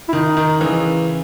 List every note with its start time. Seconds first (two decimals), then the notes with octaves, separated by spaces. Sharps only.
0.09 E4
0.13 D#3 D#4
0.37 D#3
0.61 C#3 E3